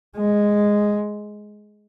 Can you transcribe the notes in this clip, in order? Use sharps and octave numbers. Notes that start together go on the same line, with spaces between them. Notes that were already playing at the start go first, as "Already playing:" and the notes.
G#3